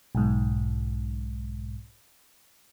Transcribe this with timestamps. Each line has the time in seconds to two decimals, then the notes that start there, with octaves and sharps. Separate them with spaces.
0.15 B1 G#2